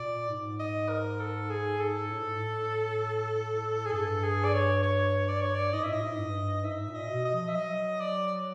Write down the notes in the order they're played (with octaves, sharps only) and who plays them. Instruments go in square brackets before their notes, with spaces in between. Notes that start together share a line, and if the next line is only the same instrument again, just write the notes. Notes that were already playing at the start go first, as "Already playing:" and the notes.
Already playing: [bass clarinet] A#2 [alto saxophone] D5
[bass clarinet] G#2
[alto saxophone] D#5
A#4
A4
G#4
A4
[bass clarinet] A2
G#2
A2
[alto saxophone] G#4
[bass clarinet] G2 [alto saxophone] A4
[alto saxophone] G#4
D5
C#5
C#5
D5
C#5
D5
[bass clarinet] G#2 [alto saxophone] D#5
[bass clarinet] A2 [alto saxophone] E5
[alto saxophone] D#5
[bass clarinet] G#2
G2
[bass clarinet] G#2 [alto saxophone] E5
[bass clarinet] A#2
[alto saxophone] D#5
[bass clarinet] B2
[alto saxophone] D#5
[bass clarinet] F3
[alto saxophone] E5
[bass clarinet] F#3 [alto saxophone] D#5
[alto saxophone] D5